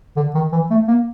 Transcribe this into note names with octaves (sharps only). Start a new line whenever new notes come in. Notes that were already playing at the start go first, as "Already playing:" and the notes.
D3
D#3
E3
A3
A#3